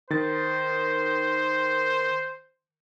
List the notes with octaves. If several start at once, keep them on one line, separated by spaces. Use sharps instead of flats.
D#3 C5 A6